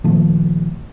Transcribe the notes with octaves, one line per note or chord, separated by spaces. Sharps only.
A#2 D#3 F3 A3